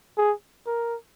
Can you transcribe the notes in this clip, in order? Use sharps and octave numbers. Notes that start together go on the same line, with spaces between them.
G#4
A#4